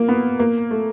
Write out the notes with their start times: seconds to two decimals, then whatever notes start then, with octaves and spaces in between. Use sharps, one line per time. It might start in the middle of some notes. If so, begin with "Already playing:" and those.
Already playing: A#3
0.08 B3
0.39 A#3
0.71 A3